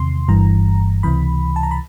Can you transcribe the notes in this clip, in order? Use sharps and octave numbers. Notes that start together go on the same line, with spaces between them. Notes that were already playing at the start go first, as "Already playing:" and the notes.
Already playing: E2 C3 D#3 C6
G1 G2 E3 A#5
C#2 C3 E3 B5
A5
A#5
B5